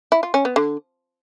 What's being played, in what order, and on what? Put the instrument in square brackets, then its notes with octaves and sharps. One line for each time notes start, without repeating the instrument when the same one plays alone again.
[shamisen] E4
F4
C#4
B3
D3